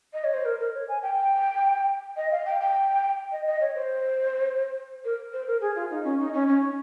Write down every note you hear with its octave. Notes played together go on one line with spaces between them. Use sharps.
D#5
C#5
C5
A#4
A#4
C#5
G#5
G5
D#5
F5
G5
G5
D#5
D#5
C#5
C5
A#4
C5
A#4
G#4
F4
D#4
C#4
D#4
C#4
C#4